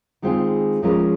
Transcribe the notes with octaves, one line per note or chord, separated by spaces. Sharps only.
D#3 G#3 C4 F4 G#4
F3 G#3 C#4 F4 A#4